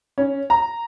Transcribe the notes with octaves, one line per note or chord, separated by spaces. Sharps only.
C#4
A#5